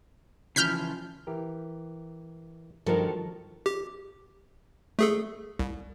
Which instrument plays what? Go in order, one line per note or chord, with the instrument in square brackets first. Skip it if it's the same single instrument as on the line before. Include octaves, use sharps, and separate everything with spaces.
[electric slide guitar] C#3 E3 F3 [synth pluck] F6 G6 B6
[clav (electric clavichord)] E3 G4 A#4
[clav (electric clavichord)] G2 [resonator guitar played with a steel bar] D#3 A4 [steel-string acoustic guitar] F3 [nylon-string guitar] F#4 A#4
[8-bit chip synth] G4
A3 G#4 A4
C2